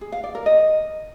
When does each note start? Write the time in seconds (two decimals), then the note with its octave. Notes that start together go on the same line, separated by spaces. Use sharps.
0.01 G#4
0.12 F5
0.24 D5
0.35 A#4
0.46 D#5